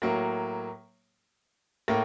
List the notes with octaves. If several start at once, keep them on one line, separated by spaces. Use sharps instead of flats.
A2 F#3 A#3
A2 A#3